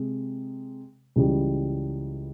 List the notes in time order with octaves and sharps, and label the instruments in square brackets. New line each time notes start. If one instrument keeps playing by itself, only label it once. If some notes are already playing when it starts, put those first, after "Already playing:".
Already playing: [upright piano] C3 G#3
C#2 C#3 E3 G3